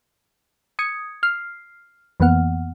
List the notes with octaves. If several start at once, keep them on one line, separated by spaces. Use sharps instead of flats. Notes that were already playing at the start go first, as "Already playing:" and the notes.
D#6 G#6 C#7
F6 C7
F2 E3 A#3 B3 F#5 F6